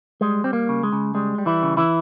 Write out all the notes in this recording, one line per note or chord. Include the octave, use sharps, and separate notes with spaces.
G3 G#3
G3 C4
A#3
C#3
G#3
C#3
G3 G#3
G3
E3 E4
C#3
E3 E4